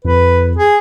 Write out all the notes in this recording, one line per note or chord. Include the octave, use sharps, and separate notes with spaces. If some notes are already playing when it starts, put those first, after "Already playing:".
F2 B4
G#4